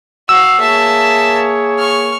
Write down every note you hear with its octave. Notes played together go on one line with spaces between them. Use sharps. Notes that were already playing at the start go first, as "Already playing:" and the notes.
F#4 F5 E6
A#3 G#4 C#5 E5 A5
C#6 F6